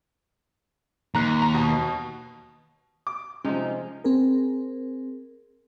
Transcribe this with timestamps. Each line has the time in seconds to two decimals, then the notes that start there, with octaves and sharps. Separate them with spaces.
1.15 D#2 A#5 F#6
1.42 A#5
1.54 B2
3.07 D6
3.45 C3 F3 G#3 C#4 D#4
4.04 C4 G#4 A#4